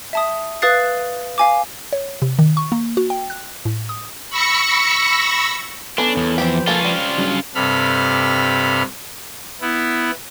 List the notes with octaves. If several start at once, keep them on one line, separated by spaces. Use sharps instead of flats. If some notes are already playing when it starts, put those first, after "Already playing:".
E5 A5 D#6
B4 F5 D#6 F#6 A6 C7
F5 G#5 D6
C#5
C3
D#3
C#6
A#3
F#4
G5
F#6
A2
D#6
B5 C#6 E6 A#6 C#7
B3 C#4 D4 A4 B4
E2
F3 C4 G4 B4
A#3 C#4 F4 A4
G3 C4
G2 C#3 F#3
G2 C3 A4 B5 F6
B3 E4